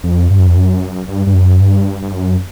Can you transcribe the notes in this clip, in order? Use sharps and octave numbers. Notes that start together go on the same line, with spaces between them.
F2
G2
F#2
F2
F#2
G2
G2
F#2
G2
G2
F#2